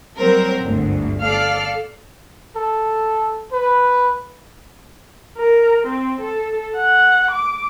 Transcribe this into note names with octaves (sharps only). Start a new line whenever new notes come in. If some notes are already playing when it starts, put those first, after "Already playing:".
F#3 G3 C4 A#4 C5
G1 D2 G#2
A4 D5 F5 F6
A4
B4
A#4
C4
A4
F#5
D6